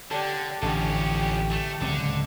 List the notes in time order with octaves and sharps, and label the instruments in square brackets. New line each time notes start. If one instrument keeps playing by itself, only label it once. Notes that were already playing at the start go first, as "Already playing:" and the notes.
[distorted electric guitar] D3 [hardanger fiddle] G4 D5 [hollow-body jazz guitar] A4
[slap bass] A1 [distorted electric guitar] F2 C#4 [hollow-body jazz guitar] D3 A4 [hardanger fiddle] G4
[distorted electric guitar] A3
[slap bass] D1 C#2 C4 [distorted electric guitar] D3